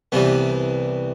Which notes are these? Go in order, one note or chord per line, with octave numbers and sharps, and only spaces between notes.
C2 C3 E3 G3 B3